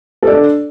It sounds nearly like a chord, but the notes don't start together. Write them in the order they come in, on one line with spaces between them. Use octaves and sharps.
A4 D5 D4